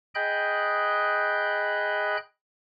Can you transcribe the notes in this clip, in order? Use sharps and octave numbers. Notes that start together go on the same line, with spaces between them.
G#4 D#5 G5 B5 F#6 G6